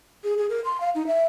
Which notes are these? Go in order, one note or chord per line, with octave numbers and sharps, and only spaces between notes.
G#4
G#4
A#4
C6
F5
D#4
E5